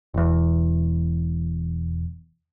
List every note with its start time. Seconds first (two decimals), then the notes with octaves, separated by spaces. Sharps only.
0.14 E1 E2